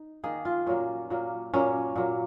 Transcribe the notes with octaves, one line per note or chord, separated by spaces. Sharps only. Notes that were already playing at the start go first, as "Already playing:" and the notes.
Already playing: D#4
D#3 A#3 G#4
F4
A#2 F#3 A#3 C#4
A#2 F#3 A#3
A#2 F#3 A#3 C#4
A#2 F#3 A#3